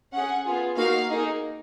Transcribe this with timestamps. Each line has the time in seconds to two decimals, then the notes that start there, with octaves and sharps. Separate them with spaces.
0.12 C#4 G#4 F#5
0.44 B3 F4 G#4
0.77 A#3 D#4 F#4 F5
1.09 A#3 D#4 G#4